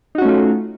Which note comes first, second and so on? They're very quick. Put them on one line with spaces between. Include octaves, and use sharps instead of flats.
D#4 F#4 C#4 A3 F4